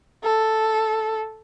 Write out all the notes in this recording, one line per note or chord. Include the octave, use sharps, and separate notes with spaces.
A4